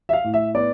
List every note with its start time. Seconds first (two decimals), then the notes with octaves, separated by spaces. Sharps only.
0.09 E5
0.13 F5
0.24 A2
0.34 E5
0.55 B3 D5